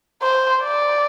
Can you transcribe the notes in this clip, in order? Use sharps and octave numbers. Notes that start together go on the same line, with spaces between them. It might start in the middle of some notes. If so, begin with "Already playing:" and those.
C5
D5